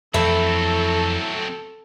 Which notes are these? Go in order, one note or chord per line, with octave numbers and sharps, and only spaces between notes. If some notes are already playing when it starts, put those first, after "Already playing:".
F2 E3 F#3 A3 C4 E4 A4